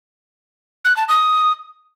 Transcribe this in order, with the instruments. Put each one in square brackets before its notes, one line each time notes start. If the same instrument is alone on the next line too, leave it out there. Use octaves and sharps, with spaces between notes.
[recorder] F#6
A5
D#6